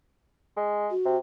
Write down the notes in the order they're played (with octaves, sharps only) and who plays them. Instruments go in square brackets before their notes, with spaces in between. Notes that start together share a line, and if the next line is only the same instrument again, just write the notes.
[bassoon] G#3
[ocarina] F#4
[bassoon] C3